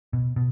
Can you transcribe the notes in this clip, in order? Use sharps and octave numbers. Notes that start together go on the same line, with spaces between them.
B2
B2